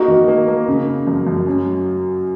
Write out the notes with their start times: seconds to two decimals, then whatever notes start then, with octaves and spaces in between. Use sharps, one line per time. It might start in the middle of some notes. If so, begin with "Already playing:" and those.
Already playing: A#3 D#4 F#4
0.08 D#3
0.28 A#3
0.48 A#3
0.68 C#3
0.87 C#3
1.07 F#2
1.27 F#2
1.47 C#4
1.66 F#3